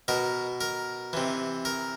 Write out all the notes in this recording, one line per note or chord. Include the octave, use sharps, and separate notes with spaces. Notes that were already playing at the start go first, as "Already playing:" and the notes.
B2 A#4
A#4
C3 E3
A#4